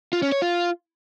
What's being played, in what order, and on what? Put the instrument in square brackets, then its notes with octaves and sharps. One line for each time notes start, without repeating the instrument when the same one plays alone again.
[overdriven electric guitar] F4
C#4
C#5
F4